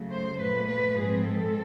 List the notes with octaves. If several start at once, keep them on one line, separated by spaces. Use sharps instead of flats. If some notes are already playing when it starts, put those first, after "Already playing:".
Already playing: C#3 F#3 A3
C5
A#2 F#3 A3 B4
B4
G#2 F3 G#3 C4 G#4
A4